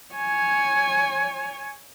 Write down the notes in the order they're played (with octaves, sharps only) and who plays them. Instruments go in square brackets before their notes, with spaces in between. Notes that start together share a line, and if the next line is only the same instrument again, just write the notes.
[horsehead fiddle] C#5 G#5